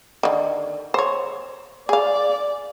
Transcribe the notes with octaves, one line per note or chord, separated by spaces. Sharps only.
D3 D#3
C5 C#5
G#4 D5 F5